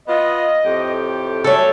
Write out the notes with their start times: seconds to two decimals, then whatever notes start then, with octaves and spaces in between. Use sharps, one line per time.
0.08 B3 F4 D#5
0.64 F2 A2 G4
1.44 F#2 G3 A3 A4 C#5 E5